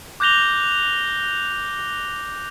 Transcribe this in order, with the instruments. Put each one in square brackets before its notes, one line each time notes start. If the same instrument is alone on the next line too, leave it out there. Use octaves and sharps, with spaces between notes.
[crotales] D6 F#6 G6 A#6 F7 G7